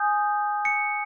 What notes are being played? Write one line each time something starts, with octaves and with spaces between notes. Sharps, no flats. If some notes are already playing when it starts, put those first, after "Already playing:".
Already playing: G#5 D#6 G6
C#7